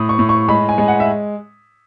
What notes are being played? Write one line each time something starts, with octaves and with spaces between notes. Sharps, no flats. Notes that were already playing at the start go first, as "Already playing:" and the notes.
Already playing: A2 D#6
C#6
A2
C#6
G#3 B5
G#5
G#3
F#5
E5